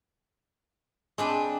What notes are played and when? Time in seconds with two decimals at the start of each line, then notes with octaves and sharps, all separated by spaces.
1.18 G#3 C4 D4 B4